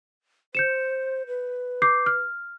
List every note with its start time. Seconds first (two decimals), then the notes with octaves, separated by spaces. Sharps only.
0.55 C5 G6 C#7 E7
1.27 B4
1.82 D6 G6 C7
2.06 F6